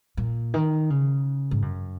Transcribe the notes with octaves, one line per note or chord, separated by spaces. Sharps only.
A#2
D#3
C#3
G#2
F#2